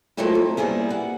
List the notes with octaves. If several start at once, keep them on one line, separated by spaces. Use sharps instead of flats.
F3 F#3 A3 A#3 D#4 E4
C3
G3 A#3 B3 E4 G#4
F#5